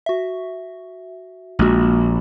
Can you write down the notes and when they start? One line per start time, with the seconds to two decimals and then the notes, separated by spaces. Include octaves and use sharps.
0.06 F#4 E5
1.59 A#1 G#3 A#3 F#4